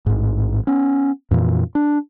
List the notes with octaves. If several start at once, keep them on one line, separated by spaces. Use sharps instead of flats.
A1 G#2
B3 C#4
F2 A#2 E3
D4